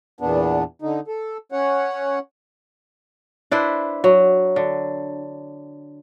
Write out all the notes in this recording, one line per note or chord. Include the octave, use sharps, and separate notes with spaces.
E2 A#2 B3 D4
D3 D#4
A4
C#4 C#5 F#5
D4 E4 B4 C5
F#3
D3